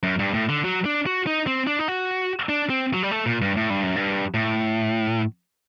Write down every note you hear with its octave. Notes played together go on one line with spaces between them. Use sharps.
F#2
G2
A2
D3
F#3
D4
F#4
D#4
C4
D4
D#4
F#4
D4
C4
F#3
G3
A3
A#2
G2
A2
G2
F#2
G2
A2